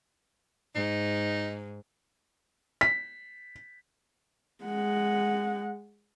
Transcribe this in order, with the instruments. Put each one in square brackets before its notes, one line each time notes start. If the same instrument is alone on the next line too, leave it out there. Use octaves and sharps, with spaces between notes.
[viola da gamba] G#2 [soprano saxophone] D#4
[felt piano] B6
[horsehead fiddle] G#3 F#5